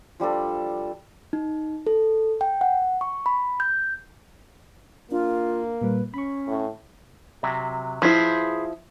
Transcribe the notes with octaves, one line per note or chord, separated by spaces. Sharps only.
F3 G3 D4 A4
D#4
A4
G5
F#5
C#6
B5
G6
A#3 D4 F4
A#2 G3 B4
C#4 B5 C#6
A2
C3 F#3
F3 E4 G#4 B4 C5